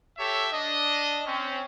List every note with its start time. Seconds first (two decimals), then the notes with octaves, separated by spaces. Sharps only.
0.18 G4 A4 C#5 E5
0.52 D4 D#5
1.26 C4 C#4